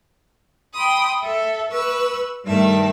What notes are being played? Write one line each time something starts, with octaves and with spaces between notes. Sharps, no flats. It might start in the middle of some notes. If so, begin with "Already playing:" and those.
G5 B5 C6 D#6
A4 E5
B4 C#6 E6
G2 D#3 A3 E5 A5